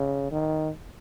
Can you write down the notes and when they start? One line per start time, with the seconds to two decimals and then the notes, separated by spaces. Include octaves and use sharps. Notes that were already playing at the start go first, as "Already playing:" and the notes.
Already playing: C#3
0.32 D#3